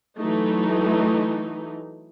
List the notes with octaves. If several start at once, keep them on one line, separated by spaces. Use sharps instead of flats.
E3 F#3 A3 D#4